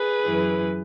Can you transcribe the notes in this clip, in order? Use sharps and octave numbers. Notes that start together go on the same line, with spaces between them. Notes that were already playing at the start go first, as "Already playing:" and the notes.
Already playing: G#4 B4
F#2 E3